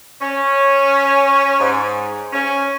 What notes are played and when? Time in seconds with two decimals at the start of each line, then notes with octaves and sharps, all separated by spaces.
0.22 C#4
1.60 G#2
2.33 C#4